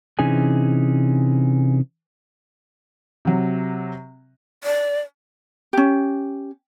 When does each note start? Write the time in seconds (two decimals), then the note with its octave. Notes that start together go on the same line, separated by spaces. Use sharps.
0.19 C3 E3 C#4 D#4 G#4 G#5
3.25 C3 F#3
4.64 D5
5.73 C#4 G4